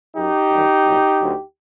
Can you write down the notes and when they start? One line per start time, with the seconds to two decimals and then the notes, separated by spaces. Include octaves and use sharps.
0.16 F#2 F#3 D#4 G4
0.51 F#2 D#3 G3
0.85 C2 A#2 F#3
1.20 D2 D3 F#3